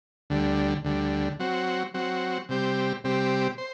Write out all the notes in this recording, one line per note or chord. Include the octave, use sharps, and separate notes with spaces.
D2 D3 G3
D2 D3 G3
F#3 C4 F#4
F#3 C4 F#4
C3 G3 C4 G4
C3 G3 C4 G4
C5